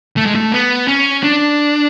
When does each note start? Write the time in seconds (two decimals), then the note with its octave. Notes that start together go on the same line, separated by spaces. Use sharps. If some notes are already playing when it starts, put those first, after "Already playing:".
0.17 A3
0.26 G#3
0.35 A3
0.52 B3
0.88 C#4
1.23 D4